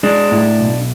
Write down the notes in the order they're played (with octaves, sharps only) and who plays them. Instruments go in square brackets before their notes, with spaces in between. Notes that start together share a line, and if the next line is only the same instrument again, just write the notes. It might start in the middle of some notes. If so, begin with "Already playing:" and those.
[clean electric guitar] G#3 D4
A2
B1